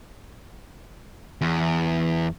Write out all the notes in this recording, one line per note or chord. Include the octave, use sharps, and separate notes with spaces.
E2